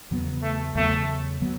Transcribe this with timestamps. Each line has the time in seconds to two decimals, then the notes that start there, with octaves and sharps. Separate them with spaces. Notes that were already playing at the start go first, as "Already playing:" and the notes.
0.11 E2 C#3 F#3 B3
0.42 A3
0.75 E2 C#3 F#3 A3 B3
1.41 C#3 F#3 B3